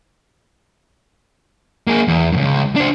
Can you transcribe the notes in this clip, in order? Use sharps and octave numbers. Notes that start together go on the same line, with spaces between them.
A#3 G#4
E2
C#2 F#2
D4 C5